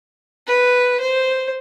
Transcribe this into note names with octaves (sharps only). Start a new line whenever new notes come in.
B4
C5